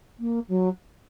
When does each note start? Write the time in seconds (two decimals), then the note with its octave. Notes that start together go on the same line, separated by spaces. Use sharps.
0.19 A#3
0.48 F#3